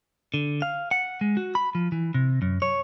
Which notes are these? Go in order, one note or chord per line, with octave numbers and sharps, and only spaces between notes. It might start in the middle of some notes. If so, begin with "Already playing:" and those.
D3
F5
F#5
G#3
F#4
B5
F3
E3
C3
F#2
C#5